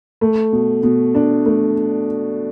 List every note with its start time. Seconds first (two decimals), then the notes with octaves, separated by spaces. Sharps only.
0.21 A3
0.53 B2
0.83 B2
1.15 D4
1.46 A3